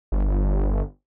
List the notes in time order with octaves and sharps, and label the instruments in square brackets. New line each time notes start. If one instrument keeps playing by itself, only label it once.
[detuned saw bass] G1